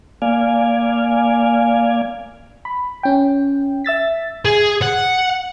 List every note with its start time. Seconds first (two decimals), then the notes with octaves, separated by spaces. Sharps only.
0.22 A#3 D5 F5 G#5
2.65 B5
3.03 C#4 G5
3.85 E5 E6 A6 B6
4.45 G#4
4.82 F#5